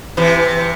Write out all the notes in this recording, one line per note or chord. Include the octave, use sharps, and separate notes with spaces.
C3 E3